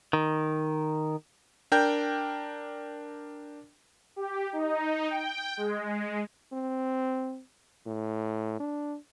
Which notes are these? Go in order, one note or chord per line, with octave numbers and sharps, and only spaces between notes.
D#3
D4 A#4 G5 G6
G4
D#4
G5
G#3
C4
A2
D4